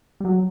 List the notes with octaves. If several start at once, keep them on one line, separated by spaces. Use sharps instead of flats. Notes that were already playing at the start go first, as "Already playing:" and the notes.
G3
F#3